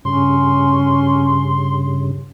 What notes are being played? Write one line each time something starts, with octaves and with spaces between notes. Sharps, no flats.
G2 C#3 C#4 C6